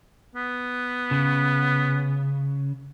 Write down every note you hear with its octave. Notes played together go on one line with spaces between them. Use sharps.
B3
C#3